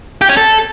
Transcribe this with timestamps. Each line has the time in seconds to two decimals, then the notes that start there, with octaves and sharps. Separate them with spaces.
0.21 G4
0.29 C#4
0.37 A4